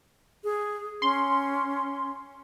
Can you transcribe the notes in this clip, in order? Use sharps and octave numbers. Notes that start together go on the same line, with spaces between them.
G#4
C#4 C6